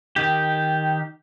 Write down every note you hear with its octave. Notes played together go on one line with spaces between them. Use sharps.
D#3 G4